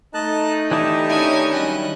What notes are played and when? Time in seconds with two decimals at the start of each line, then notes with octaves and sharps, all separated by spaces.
0.14 A3 D#4 D#5 A5 F#6
0.71 E3 D4 E4 G4 D#5 A5
1.10 D#3 C#4 D4 E4 G#5
1.53 F#3 G3 C#4 D#5 F#6